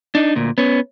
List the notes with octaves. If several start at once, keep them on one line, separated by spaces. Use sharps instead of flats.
D4 D#4
D2 A#2
B3 C#4